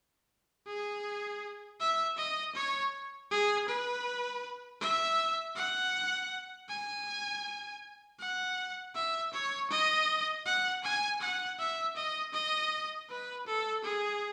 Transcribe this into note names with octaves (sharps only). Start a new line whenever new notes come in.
G#4
E5
D#5
C#5
G#4
B4
E5
F#5
G#5
F#5
E5
C#5
D#5
F#5
G#5
F#5
E5
D#5
D#5
B4
A4
G#4